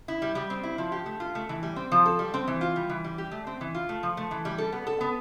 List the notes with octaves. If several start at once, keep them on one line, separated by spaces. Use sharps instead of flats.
E4
G3
G3
C4
E4
F3
G4
A3
F4
A3
E3
G3
C4
F3
A4
G3
C4
E3
F4
G3
E3
G3
G4
A3
C4
E3
F4
A3
F3
A3
E3
G3
A4
B3
A4
B3